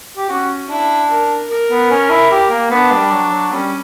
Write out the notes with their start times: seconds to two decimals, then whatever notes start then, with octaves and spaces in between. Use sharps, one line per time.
0.17 G4
0.28 C#4 F#4
0.69 D4 E4
1.09 A#4
1.49 A#4
1.70 B3
1.91 C#4
2.10 E4
2.31 G4
2.50 A#3
2.70 B3 D4
2.92 G3
3.11 F#3
3.31 F#3
3.52 G3 C#4